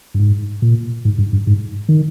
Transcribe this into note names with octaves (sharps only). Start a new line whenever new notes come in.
G2
G#2
A#2
G#2
G2
G2
G#2
D#3